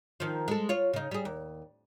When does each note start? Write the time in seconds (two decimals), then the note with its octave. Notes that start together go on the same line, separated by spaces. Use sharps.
0.20 D#3 F3
0.48 G#3 A4
0.69 F4 C#5
0.93 C#3 D#4
1.11 G3 G#4
1.25 D#2